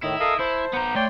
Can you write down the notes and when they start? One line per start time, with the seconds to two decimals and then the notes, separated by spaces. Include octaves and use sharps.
0.03 A2 D#3 D#4 E4
0.20 A4 A#4 D#5 F5
0.39 E4 C5 A5
0.73 B3 A#5 G6
0.96 A3 C#5 D5 G5 C6